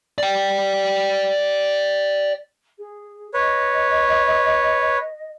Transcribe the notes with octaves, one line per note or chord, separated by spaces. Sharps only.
D5 G5
G#4
B4 C#5 D#5